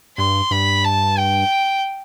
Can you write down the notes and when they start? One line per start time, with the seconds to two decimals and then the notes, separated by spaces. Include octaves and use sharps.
0.17 G2 C6
0.51 G2 B5
0.84 A5
1.18 G5